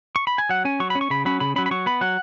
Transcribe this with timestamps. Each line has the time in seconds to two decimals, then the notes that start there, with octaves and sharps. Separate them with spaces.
0.16 C#6
0.27 B5
0.38 G#5
0.49 F#3 F#5
0.65 C#4 G#5
0.80 F#3 C#6
0.90 B5
0.95 C#4
1.01 C#6
1.10 C#3 B5
1.25 F#3 C#4 B5
1.40 C#3 B5
1.56 F#3 C#4 B5
1.66 B5
1.71 F#3 C#6
1.86 B3 B5
2.01 F#3 F#5